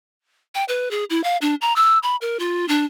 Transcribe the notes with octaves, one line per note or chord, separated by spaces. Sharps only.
G5
B4
G#4
E4
F5
D4
A#5
E6
B5
A#4
F4
D4